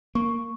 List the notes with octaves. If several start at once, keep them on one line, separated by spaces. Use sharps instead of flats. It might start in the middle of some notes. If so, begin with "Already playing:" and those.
A#3 C#6